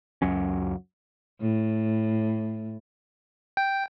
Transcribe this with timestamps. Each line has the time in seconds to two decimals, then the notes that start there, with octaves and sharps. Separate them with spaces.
0.22 C#2 F#2 F#3 C#4
1.41 A2
3.57 G5